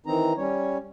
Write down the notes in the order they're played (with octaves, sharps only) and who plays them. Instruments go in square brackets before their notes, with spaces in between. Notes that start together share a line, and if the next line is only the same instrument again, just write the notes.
[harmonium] D#3 E3 C4 D#4 A#5
G3 C#4 C#5